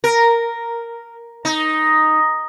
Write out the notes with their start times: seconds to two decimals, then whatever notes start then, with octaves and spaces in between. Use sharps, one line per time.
0.04 A#4
1.45 D#4